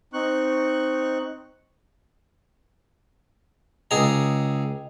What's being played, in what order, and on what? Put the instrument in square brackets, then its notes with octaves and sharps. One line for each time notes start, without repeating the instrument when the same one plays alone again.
[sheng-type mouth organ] C4 D#4 C#6 F#6
[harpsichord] C#2 G#4 A#5 [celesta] D#5 G5